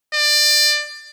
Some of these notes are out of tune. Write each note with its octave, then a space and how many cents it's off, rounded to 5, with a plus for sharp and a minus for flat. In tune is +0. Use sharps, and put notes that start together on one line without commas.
D5 +20